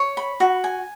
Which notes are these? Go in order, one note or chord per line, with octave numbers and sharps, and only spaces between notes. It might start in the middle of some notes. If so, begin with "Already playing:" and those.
Already playing: C#5
B5
F#4
G#5